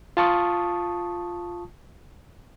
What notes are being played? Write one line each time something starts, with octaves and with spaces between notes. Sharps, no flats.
F4 A5 C#6 D#6